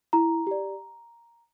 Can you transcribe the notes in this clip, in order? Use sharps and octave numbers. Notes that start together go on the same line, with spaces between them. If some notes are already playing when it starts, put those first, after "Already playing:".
E4 A#5
G4 D5